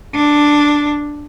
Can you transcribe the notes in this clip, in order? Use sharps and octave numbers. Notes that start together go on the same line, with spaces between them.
D4